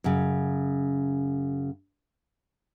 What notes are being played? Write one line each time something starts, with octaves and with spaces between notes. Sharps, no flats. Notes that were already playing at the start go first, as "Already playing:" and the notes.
F#2 C#3